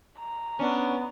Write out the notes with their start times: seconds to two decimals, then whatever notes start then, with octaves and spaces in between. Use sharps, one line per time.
0.19 A#5
0.59 B3 C#4 D4